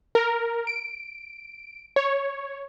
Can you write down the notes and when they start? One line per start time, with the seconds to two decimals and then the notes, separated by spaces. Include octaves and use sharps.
0.15 A#4
0.67 D7
1.96 C#5